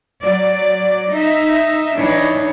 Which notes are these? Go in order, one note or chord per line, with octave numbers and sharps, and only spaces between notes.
F#3 D5
D#4 E5
E3 D4 D#4 C#5